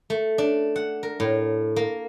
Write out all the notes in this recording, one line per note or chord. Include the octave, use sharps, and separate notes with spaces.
A3
D4
F#5
A#4
A2
A#3